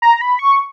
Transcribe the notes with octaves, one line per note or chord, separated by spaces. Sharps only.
A#5
B5
C#6